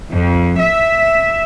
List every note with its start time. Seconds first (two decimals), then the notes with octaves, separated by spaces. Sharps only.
0.12 F2
0.59 E5